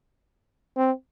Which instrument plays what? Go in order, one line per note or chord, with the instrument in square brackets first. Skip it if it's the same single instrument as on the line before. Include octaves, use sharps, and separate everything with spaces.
[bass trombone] C4